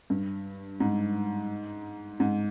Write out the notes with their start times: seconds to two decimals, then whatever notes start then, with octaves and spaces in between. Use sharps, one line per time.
0.10 G2
0.80 G#2
2.20 G#2